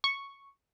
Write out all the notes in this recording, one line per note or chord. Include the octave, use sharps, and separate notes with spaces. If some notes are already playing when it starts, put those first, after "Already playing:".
C#6